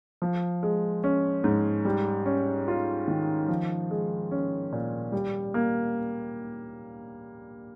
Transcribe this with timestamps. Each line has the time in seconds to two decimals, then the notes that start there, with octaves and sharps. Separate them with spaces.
0.22 F3
0.63 G#3
1.04 C#4
1.44 G#2
1.85 G3
2.26 C#4
2.68 F4
3.08 D#3
3.49 F3
3.91 G#3
4.31 C#4
4.72 A#2
5.12 G3
5.54 A#3